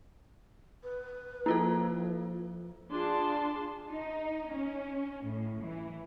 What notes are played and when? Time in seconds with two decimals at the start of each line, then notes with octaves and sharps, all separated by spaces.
0.84 B4
1.46 F3 A#3 E4 F4 A4
2.92 D4 F4 G#4 A5 C6
3.89 D#4
4.53 C#4
5.24 A2
5.64 E3